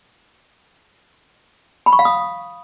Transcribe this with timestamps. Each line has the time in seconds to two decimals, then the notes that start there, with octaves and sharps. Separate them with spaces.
1.86 B5
1.93 C#6
1.99 F5
2.05 D#6